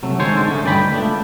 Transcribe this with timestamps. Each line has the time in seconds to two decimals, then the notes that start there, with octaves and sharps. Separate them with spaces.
0.03 C3 F#3 A3
0.19 D#3 G#3 A4 C5 C#5
0.35 D3 D4
0.48 A3 C#4 D#4
0.63 D2 G2 D#4 D5 G5 B5
0.90 C#2 A3 B3 D4